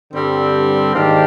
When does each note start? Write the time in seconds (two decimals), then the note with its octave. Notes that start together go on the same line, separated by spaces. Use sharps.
0.13 G2 D3 G3 C4
0.93 G#2 D#3 A#3 D4 G4